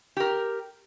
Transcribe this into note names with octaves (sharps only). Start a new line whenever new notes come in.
G4 A#4